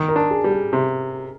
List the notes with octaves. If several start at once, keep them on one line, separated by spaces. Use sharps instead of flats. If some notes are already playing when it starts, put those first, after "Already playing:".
Already playing: D#3
A#4
D4
G#4
G3
G#4
C3